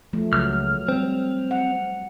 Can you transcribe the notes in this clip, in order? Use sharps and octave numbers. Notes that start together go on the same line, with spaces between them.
F3 A3
C#2 F#3 F6
G3 C4
F#5